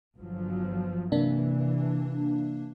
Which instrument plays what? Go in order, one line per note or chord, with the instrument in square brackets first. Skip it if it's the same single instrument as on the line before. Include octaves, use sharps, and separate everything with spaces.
[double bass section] G1 F3 F#3
[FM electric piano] C3 A#3 D4 [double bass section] E3